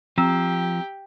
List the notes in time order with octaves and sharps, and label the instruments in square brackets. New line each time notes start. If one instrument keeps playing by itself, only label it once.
[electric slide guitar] F3 [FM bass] C4 [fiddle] G4 [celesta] A#5 E6 E7